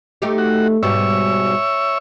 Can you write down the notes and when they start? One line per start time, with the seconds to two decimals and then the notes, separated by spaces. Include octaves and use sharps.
0.22 A3 D#4 G4
0.38 F#4
0.83 G#2 B2 G3 C#5 E5